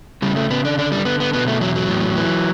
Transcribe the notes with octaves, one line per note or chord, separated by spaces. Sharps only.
C#3 G3
A3
C#3 B3
D4
D3 D4
G3
D3 B3
B3
B2 B3
A3
E2 F#3
F#3
A2
E3